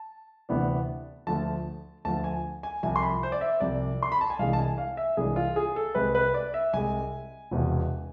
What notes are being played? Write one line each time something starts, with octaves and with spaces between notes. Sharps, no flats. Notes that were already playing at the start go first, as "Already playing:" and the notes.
Already playing: A5
D2 C3 E3 B3 D4
D2 D3 F3 A5
D2 D3 F3 A5
G#5
G#5
C2 C3 F3 G#5
C6
B5
C5
D5
E5
C2 C3 F3 D5
C6
B5
A5
G#5
C2 C3 E3 G#3 D4 F5
A5
G#5
F5
E5
C2 C3 E3 G#3 D4 G#4
F4
G#4
A4
C2 C3 G#3 B4
B4
D5
E5
C2 C3 G#3 G#5
E1 E2 C3